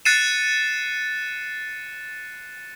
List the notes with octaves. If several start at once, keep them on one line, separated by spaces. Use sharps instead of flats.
F#6 A6 C7 C#7 D#7 E7